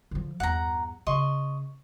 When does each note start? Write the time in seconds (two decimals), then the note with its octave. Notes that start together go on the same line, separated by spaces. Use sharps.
0.11 D3 F3
0.40 E2 G2 F#5 A#5
1.07 C#3 D#5 C6 C#6